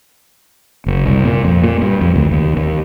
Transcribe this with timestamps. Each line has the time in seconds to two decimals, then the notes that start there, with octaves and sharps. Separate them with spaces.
0.86 F#1
1.05 C2
1.25 A#2
1.45 F2
1.64 A#2
1.82 G2
2.01 F2
2.16 D2
2.31 D#2
2.57 D#2